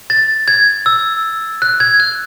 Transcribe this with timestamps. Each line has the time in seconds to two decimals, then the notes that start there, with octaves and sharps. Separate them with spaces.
0.10 A6
0.48 G#6
0.86 E6
1.62 F#6
1.80 G#6
2.00 F#6